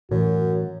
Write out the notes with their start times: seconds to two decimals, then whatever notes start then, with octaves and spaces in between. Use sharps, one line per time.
0.11 F#2 A2 E3 F#4